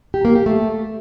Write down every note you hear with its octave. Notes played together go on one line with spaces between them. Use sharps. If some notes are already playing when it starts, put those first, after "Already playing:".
G4
A#3
G4
A3